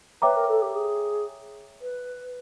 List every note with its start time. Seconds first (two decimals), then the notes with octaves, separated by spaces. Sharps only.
0.22 B4 C#5 E5 G5 A#5 D6
0.36 A#4
0.48 A4
0.62 G4
0.75 G#4
1.81 B4